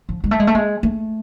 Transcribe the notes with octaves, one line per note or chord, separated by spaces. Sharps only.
F3
G#3
A3
G#3
A3
G#3
A3